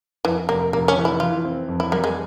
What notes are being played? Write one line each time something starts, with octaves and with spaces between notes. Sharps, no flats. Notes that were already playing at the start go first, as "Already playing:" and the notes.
F2 E3
F1 A#3
F1 A#3
C#4
E3
E4
E3 F4
C4
F2
E4
G3 A#3
G#3